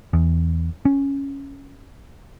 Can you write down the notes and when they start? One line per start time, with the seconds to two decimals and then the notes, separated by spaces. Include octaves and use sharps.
0.13 E2
0.85 C#4